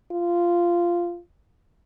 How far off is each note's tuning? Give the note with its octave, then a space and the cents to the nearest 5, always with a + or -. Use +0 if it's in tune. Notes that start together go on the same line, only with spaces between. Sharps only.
F4 -10